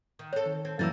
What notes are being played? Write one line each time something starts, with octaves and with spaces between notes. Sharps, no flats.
D#3
C4 A4 C#5
D#3
C4
F#2 E3 G3 A#3 E6 A6